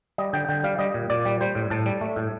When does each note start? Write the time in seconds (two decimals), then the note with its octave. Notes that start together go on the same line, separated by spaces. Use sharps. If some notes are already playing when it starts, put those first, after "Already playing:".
0.18 G3 D#5
0.33 D3 G5
0.49 D3 G5
0.64 G3 F5
0.79 G3 D#5
0.94 A#2
1.10 A#2 D5
1.25 G3
1.41 G3 C5
1.55 A2
1.70 A2 A5
1.86 G3
2.01 A3
2.16 A2